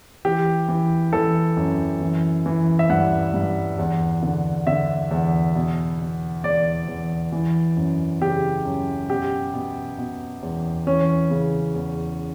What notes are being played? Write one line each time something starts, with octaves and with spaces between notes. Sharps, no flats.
E3 G4
E3
E3 A4
F#2
E3
E3
E5
G2 F#5
G2
E2
D3
D3 E5
E2
B2
B2
E2 D5
E2
E3
F#2
C#3 G4
F#2
B2 G4
B2
B2
E2
E3 C#4
C#3
E2